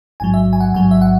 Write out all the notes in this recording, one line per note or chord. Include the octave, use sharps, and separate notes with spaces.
A1 G#2 F#3 G#5
E5
G#5
F#5
A1 G#2 F#3 G#5
E5
F#5